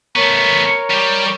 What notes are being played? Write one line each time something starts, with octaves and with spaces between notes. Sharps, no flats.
A3 B3 A#4 C#5
G3 G4